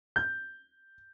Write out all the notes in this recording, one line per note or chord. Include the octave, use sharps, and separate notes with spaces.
G6